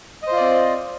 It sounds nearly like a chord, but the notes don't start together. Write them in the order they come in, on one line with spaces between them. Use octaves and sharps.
D#5 C5 F4 D5 C4